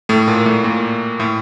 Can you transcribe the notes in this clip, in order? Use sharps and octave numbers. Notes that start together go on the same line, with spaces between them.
A2 A3
A#2 A#3
A2 A3
A#2 A#3
A2 A3